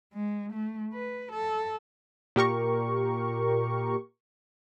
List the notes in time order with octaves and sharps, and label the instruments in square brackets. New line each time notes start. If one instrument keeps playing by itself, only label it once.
[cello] G#3
A3
B4
A4
[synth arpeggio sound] A#2 G4 A#4 C#6